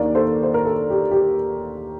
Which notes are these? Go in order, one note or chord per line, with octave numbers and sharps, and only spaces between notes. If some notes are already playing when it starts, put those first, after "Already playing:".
Already playing: D#2 D#3 A#3 D4 A#4 D5
A4 C5
C5
A#4
A4
G4
G4